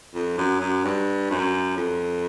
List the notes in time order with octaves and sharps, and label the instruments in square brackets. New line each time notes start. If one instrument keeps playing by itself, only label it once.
[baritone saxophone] F2
F#2
F#2
G2
F#2
F2